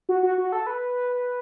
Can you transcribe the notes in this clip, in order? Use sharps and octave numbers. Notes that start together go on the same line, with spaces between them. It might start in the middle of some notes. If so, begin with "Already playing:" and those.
F#4
F#4
F#4
A4
B4